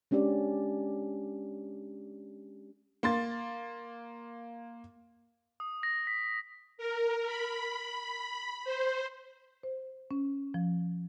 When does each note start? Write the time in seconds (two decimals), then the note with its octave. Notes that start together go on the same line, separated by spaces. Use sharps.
0.11 G#3 C#4 D4 G4 D5
3.03 A#3 C6 A6
5.60 D#6
5.83 A#6
6.07 B6
6.78 A#4
7.26 B5
8.64 C5
9.63 C5
10.11 C#4
10.54 F3